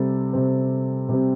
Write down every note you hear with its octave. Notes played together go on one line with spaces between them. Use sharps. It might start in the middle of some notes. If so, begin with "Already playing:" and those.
Already playing: C3 G3 C4 A4
C3 G3 C4
C3 G3 C4 G4